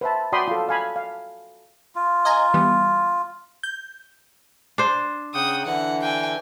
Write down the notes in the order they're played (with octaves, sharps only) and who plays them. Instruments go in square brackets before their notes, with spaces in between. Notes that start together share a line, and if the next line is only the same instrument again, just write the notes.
[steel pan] B4 C5 E5 A5
F#4 D5 G5 B5 C6 D#6
F4 A4
F5 G#5 B5
F5
[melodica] F4
[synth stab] D#5 G#5 A#5
E3 G3 B3
G6
[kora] D4 C5
[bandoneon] C#3 F#5 G5 [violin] D#6
[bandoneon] D3 E3 [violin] F#5
[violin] G5 G#5